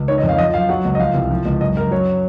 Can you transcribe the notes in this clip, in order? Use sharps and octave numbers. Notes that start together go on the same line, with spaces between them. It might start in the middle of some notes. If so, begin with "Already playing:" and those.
Already playing: C#2
D#3 C#5
D#5
F2
F5
F3 D#5
F#2 F5
F#3 F#5
C#2
D#5
F3 F5
C2
F3
C#2
F#2 D#5
F#2 A#4
F#3 C#5